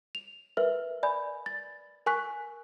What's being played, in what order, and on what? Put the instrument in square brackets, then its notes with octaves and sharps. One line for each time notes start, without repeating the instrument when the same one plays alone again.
[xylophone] F7
A#4 B4 E5 F6
D5 G#5 B5 G6
A6
A#4 G#5 C#6 F#6 B6